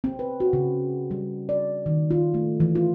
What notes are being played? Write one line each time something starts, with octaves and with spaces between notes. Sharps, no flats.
C4
B4
F#4
C#3
G3
D5
D#3
F4
A3
E3
F4